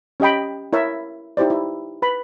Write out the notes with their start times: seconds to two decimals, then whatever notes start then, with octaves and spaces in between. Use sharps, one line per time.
0.20 C#4 G4 D#5 G5 B5
0.73 E4 A#4 C#5 E5
1.37 D#4 E4 G4 C5 D5
1.50 E4
2.02 B4 B5